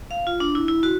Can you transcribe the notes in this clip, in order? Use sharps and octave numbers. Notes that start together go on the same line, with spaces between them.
F5
F4
D4
E4
E4
F#4